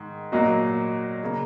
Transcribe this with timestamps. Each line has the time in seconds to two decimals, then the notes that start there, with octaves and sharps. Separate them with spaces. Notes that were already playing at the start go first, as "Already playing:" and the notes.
Already playing: G#2 D#3
0.32 A#2 F#3 A#3 F#4 D#5
1.23 C#3 A#3